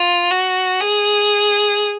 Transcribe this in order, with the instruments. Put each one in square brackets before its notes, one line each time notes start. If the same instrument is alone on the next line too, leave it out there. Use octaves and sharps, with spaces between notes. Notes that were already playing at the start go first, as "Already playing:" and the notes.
Already playing: [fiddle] F4
F#4
G#4